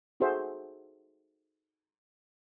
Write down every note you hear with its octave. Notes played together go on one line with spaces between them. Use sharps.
D#4 F#4 G#4 A4 C5 E5